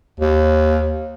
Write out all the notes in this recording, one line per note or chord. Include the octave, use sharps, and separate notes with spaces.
D#2